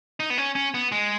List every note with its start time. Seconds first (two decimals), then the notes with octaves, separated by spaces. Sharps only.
0.20 D#4
0.30 B3
0.38 C#4
0.55 C#4
0.74 B3
0.92 G#3